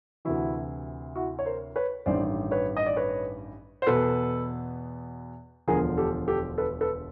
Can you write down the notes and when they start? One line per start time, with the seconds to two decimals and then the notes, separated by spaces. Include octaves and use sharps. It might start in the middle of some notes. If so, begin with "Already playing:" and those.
0.25 D2 C3 E3 E4 F#4
1.16 E4 F#4
1.39 C#5
1.45 A#4 C5
1.76 B4 C#5
2.06 A1 G2 D#3 C5 D5
2.51 B4 C#5
2.77 D#5
2.86 D5
2.96 B4 C#5
3.82 C5
3.87 E2 B2 A4 B4
5.67 E1 D2 D3 F3 G#4 A#4
5.98 G4 A4
6.28 G4 A4
6.58 A4 B4
6.81 A4 B4